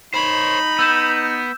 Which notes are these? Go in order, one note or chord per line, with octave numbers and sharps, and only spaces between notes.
D#4 C5 C#5 B5
B3 E6 G6 E7